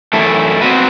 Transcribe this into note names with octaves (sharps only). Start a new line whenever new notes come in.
F#2 E3 A3 E4 A4
F#3 C4 F#4 B4